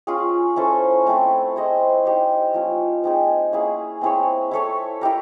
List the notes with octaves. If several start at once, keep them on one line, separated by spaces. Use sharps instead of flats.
C#4 F4 G#4
C#4 E4 A4 C5
A3 C4 E4 A4
E4 G#4 C5 D#5
C4 D#4 G4
F3 A#3 C#4
C4 D#4 G#4
A#3 C#4 E4 G#4
C4 E4 G#4 C#5
E4 A4 C#5 E5
E4 G4 A#4